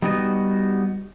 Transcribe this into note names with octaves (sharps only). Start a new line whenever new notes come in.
G3 B3 D#4 F#4 B4 D#5